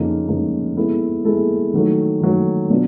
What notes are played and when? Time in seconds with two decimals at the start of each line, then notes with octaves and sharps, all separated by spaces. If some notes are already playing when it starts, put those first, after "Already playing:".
Already playing: F2 C#3 F3 A#3 D#4
0.28 F2 C#3 F3 A#3 D#4
0.77 G#3 B3 E4 A4
1.25 G#3 B3 E4 A4
1.74 D#3 F#3 A3
2.21 D#3 F#3 A3
2.70 B2 F#3 B3 D4 F4